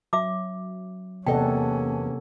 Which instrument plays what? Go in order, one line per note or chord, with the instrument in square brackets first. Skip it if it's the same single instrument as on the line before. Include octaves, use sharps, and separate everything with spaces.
[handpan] F#3 [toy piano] E5 D6
[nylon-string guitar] E2 D#5 [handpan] C3 A4 F#5 [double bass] A#3 C#4 [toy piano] G5